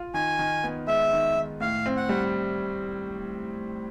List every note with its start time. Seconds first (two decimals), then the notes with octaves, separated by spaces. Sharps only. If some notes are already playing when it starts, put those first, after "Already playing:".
Already playing: F4
0.14 D#3 G#5
0.39 D#3
0.64 B3
0.87 G#3 E5
1.12 D#3
1.36 D#3
1.60 A2 F5
1.86 C4
1.97 F#5
2.09 G3